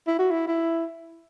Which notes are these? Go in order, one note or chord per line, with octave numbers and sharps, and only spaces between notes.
E4
F#4
E4
E4